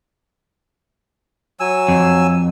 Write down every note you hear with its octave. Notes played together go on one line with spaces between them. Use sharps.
F#3 G#5 E6
F2